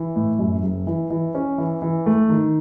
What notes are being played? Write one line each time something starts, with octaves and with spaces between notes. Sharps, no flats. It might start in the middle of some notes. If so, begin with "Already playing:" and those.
Already playing: E3
A2
F#2
F#1
E3
E3
C#4
E3
E3
A3
D#3